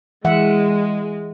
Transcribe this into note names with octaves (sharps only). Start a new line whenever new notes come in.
E3 G#3 E5 F#5